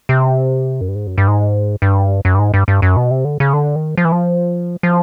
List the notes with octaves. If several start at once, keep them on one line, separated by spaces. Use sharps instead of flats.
C3
F#2
G2
G#2
F#2
G2
G#2
G2
F#2
G2
G#2
G2
G2
F#2
B2
C3
D3
C#3
D3
D#3
F3
E3
F3
F3